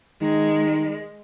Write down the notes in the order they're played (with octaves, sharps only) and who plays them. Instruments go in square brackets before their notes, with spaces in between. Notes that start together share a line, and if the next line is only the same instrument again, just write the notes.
[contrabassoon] D#3 [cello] G#3